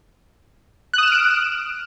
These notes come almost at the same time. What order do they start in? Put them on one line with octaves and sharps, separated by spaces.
F#6 D#6 E7 F6 D7